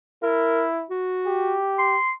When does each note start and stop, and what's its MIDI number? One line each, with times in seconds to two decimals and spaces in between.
0.23 0.85 64
0.23 0.64 70
0.91 1.57 66
1.26 1.96 67
1.79 2.12 84